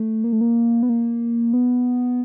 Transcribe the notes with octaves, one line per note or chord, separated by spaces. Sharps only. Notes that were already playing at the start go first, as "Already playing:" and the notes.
Already playing: A3
A#3
A3
A#3
B3
A#3
B3